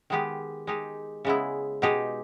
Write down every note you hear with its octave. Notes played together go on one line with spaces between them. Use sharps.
D#3 G#3 B3 G4
G#3 D#4 G4
C#3 G#3 B3 E4
B2 G#3 D#4 G4